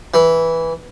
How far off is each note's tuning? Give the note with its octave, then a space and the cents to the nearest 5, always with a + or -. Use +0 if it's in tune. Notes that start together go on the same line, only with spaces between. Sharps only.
E3 -10